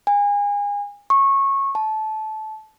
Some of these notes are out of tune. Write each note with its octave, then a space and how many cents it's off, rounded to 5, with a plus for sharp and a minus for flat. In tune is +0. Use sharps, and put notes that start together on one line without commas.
G#5 -30
C#6 -20
A5 -20